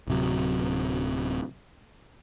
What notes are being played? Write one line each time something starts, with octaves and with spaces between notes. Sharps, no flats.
D1 C3 F#3